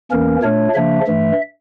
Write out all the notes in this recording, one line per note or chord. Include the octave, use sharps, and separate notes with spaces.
E2 E3 A#3 C#4 A#4
A#2 A3 D4 C#5
C#3 F3 A#3 D4 E5
G2 E3 A3